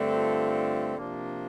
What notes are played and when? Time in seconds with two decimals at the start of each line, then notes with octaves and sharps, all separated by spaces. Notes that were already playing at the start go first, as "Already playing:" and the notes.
Already playing: G2 D3 A3 C4
0.15 F4
0.97 C3 F3 A#3 D4